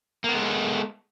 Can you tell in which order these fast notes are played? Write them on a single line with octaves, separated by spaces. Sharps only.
A#3 B3 G#3 A4